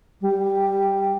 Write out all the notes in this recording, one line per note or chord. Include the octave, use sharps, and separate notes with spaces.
G3